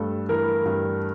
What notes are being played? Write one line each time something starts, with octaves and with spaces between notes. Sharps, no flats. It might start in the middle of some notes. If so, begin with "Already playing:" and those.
Already playing: G2 A3 A4
E3 A#4
G2